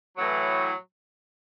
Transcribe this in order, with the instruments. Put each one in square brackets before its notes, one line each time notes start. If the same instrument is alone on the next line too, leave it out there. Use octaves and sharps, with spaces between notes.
[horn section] A2 E3 F#3